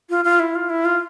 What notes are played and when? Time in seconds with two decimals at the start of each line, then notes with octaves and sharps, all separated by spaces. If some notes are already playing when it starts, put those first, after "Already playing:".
0.10 F4
0.25 F4
0.40 E4
0.55 F4
0.70 E4
0.85 F4